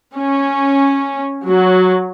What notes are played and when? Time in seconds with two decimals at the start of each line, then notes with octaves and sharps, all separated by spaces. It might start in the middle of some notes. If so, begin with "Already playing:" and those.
0.16 C#4
1.45 F#3